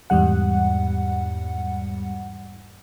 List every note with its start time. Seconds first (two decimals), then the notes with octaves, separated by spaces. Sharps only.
0.10 E2 G#2 G3 F#5